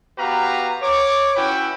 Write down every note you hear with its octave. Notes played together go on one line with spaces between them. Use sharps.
B3 F#4 G4 B4 F5 A#5
C#5 D6
C#4 E4 F#4 B4 G5 B5